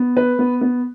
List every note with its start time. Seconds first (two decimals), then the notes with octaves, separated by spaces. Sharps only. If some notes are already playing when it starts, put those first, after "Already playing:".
Already playing: B3
0.17 B4
0.39 B3
0.61 B3